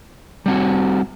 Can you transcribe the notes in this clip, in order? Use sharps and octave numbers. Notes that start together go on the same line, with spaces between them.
G3 C4 F#4